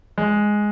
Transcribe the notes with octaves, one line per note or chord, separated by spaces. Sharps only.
G#3